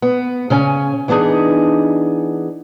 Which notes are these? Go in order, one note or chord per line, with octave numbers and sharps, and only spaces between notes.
B3
C#3 C#4 G#5
E3 B3 D4 D#4 G#4